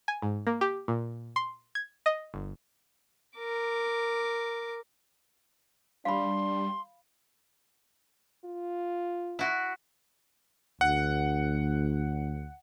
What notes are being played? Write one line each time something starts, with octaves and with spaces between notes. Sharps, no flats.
G#5
G#2
A#3
G4
A#2
C6
G#6
D#5
G1
A#4 D6
G3 D4 F5 B5 C6
F4
E4 F#4
D2 F#5